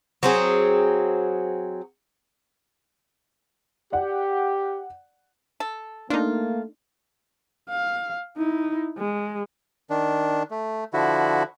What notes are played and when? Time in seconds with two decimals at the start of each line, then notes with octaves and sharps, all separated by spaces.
0.23 F#3 C4 G#4
3.93 G4 D5 F#5
5.60 A4
6.10 A3 A#3 D4 D#4 F4
7.70 F5
8.37 D#4 E4
8.98 G#3
9.90 D#3 D4
10.51 A3
10.94 D3 F3 E4 F#4